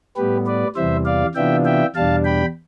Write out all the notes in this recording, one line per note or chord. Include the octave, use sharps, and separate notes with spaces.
A2 G3 B3 G4 B4
B4 D5
E2 C3 E3 G3 C5 E5
D5 F5
C3 E3 B3 D4 F4 E5 G5
E5 G5
E2 B2 G3 D4 F5 A5
G5 B5